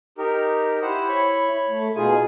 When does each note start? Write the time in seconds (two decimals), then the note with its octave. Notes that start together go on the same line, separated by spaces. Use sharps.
0.18 D#4 G4 A#4
0.82 E4 G4 C5 F#5
1.09 C#5 B5 C#6
1.69 A3
1.96 B2 D#4 F4 G#4 G#5